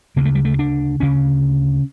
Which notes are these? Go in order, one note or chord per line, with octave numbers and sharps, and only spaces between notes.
D2 C#3 A#3
A3
G3
A3
D4
D2 C#3 C#4